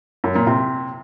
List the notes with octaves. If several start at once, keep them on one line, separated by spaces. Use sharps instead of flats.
F#2
A#2
C3